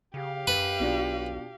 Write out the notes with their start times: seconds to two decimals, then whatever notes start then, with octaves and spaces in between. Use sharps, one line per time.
0.14 C#3 G4 F5
0.47 F#2 B4
0.80 B1 B2 D4 F4